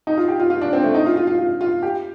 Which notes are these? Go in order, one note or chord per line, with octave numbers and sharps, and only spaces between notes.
D#4
F4
G4
F4
F4
D4
C4
A3
D#4
F4
F4
F4
F4
F4
G4